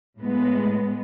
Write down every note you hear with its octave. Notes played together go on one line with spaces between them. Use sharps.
A2 G#3 B3